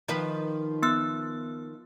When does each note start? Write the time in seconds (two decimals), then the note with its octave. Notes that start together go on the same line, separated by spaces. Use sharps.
0.08 D#3 F3 B4
0.83 B3 E6 F#6